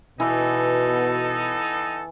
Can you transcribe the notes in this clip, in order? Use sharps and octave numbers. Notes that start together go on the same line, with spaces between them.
B2 E3 B3 D#4 A4